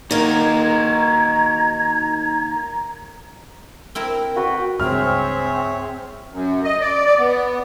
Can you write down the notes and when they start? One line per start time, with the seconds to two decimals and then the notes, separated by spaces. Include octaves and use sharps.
0.11 D#3 A#3 D#4 F#4 A#5 G#6
3.95 C4 E4 A#4
4.36 F#4 B4 G5
4.48 G5
4.80 C#2 G2 C4 G#4 C#5 E5 F6
6.33 F#2
6.64 D#5
6.81 D5
7.06 D5
7.19 B3